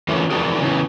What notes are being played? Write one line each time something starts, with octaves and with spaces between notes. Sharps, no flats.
E3 A3 A#3 C#4 F4
E3 F3 D4 F#4 G#4 A#4
C#3 E3